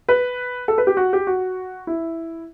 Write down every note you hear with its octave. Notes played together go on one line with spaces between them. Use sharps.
B4
A4
B4
G4
F#4
G4
F#4
E4